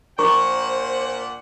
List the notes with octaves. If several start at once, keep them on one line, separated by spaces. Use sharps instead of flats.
A#2 D4 A#4 C5 F#5 C#6